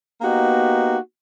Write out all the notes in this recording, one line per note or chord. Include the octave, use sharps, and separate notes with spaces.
A#3 B3 D#4 F#4 G4